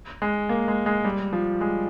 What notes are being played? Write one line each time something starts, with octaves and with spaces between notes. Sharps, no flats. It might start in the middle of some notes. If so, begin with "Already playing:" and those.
G#3
A#3
G#3
G#3
G3
F3
G#3